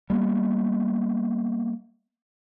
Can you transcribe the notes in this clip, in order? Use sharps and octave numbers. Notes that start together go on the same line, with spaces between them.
G3 A#3 B3